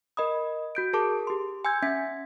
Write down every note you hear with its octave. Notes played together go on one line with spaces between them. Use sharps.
A#4 D#5 B5 D#6
F#4 G6 D7
G#4 A#4 A5 D6
G4 C6
G#5 C6 E6 G6 G#6
C#4 E5 G#6 B6